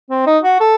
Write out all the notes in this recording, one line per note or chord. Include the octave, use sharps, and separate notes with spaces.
C4
D#4
F#4
A4